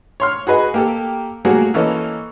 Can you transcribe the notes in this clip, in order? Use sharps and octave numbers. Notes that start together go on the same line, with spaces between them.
C#5 C6 F6
F#4 G#4 B4 D#5 G#5
A#3 G4 A4
F#3 G3 A3 A#3 F#4 G#4
E3 A#3 C#4 A4 D#5